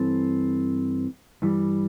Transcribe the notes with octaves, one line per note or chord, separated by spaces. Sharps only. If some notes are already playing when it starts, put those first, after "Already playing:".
Already playing: G2 E3 C4 A4
G2 E3 G3